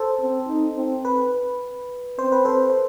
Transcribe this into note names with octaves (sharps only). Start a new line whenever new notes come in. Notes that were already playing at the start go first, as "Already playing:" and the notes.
Already playing: A4 C5
C4
D#4
C4
B4
C4 C5
B4
A4 C5
C5